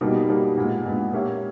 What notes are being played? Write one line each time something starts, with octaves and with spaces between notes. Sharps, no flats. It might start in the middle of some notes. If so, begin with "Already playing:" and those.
B2 G3 A#3 D#4
B2 G3 A#3 D#4
A#2 G#3 B3
A#2 G#3 B3
A#3 C#4 G4 C#5 E5